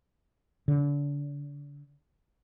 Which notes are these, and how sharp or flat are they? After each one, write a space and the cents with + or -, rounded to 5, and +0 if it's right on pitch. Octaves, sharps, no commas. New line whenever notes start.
D3 -35